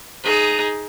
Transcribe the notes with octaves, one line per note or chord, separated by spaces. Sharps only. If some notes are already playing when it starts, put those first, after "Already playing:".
D#4 G#4